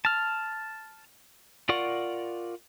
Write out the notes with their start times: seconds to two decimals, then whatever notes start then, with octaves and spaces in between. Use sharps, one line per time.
0.05 A5 F6
1.69 F4 A#4 D5 F#5 C#6